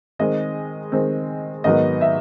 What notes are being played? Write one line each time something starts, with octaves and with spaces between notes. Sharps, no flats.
D#3 G#3 C4 D#5
D#3 G#3 C4
G#2 D#3 F#3 B3 D#5
E5